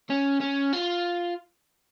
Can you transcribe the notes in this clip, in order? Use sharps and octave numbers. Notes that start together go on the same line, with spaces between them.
C#4
C#4
F4